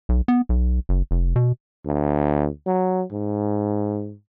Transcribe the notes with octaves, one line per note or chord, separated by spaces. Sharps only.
B1
B3
B1
F#1
F1
B2
D2
F#3
G#2